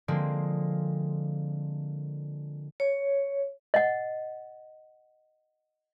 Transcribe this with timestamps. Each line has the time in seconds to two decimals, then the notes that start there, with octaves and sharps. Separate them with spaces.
0.08 D3 F3 G#3 A#3 C4
2.80 C#5
3.74 D#5 F#5